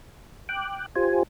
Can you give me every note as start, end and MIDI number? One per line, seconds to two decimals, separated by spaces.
0.49 0.86 79
0.49 0.86 86
0.49 0.86 90
0.96 1.23 65
0.96 1.23 67
0.96 1.23 72
0.96 1.23 80